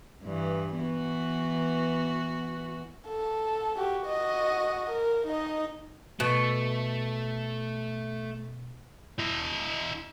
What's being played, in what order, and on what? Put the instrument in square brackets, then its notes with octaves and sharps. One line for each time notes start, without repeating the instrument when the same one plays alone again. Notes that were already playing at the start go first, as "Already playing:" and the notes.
[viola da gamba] G2 E3
E3 B3 F#4
[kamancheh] A4
F#4 G4
F#4 D#5
A#4
D#4 D#5
[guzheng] B2 [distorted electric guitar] A3
[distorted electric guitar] E4 D#5